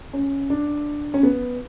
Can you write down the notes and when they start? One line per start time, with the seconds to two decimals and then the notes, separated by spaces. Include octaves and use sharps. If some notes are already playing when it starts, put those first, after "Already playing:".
0.13 C#4
0.50 D4
1.14 C#4
1.23 B3